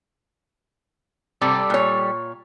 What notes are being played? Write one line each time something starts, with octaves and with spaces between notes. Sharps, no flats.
C3 G3 A4 D5
A#2 C#5